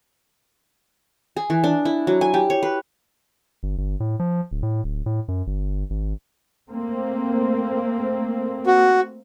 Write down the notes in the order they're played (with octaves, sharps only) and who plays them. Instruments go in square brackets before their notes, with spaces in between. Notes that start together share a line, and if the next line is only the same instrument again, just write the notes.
[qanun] G#4
E3
D4
E4
F#3
G#5
G4
C#5
B4
[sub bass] G1
G1
A2
F3
D1
A2
D1
A2
F#2
G1
G#1
[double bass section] A3 A#3 C4
[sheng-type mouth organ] F#4